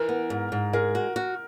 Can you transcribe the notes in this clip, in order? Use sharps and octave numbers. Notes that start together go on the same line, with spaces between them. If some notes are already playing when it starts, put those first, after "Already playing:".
Already playing: E3 A#4
B3
G#2
G#2
G#3 A#4
F#4
F#4